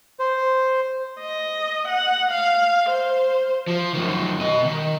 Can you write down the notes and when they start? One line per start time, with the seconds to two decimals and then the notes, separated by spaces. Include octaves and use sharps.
0.19 C5
1.20 D#5
1.87 F#5
2.31 F5
2.89 C5
3.68 F3
3.94 F#2 D#3
4.40 B2 D#5
4.65 D#3